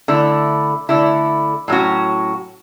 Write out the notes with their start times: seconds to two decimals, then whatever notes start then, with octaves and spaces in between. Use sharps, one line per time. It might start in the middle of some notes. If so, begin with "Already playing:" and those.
0.08 D3 A3 E4
0.89 D3 A3 E4
1.68 A2 F#3 A3 C#4 F#4